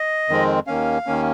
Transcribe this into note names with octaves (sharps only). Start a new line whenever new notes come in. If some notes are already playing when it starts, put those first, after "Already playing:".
Already playing: D#5
F2 D#3 G#3 C4
D#2 D#3 A#3 C#4 F5
D#2 D#3 A#3 C#4